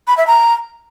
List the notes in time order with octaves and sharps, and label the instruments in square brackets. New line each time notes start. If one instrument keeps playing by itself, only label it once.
[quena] B5
E5
A#5